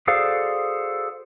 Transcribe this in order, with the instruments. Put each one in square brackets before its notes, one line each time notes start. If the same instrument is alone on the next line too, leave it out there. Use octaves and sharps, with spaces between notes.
[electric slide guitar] F#4 G#4 A4 C5 D5 F5